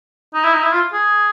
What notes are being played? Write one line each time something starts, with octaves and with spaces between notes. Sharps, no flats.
D#4
E4
D#4
E4
F4
G#4